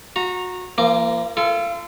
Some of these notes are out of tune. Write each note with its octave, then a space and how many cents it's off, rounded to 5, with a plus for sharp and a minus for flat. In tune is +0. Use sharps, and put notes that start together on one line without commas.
F#4 -25 A#5 +0
F3 -45 A#3 +0 D6 +0
F4 -35 A4 +0